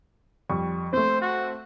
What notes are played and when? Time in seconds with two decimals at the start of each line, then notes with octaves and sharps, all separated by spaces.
0.49 F2 G3 C#6
0.93 A3 C4 C5
1.21 F#4